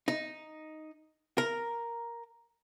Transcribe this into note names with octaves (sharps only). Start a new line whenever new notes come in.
D#4
A#4